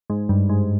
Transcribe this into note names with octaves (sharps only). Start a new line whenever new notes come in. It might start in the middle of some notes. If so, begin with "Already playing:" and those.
G#2
G2
G#2